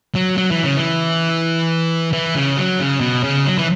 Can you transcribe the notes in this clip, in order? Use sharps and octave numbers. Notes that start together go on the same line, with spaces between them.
F#3
F#3
E3
C#3
E3
E3
C#3
F#3
C#3
B2
C#3
F#3
E3